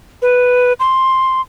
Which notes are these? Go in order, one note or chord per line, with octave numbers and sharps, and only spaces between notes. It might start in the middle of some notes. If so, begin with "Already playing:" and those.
B4
C6